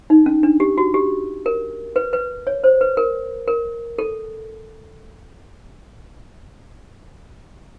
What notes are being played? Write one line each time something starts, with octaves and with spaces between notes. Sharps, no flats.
D#4
C#4
D4
G4
F#4
G4
A#4
B4
B4
C#5
C5
B4
A#4
A#4
A4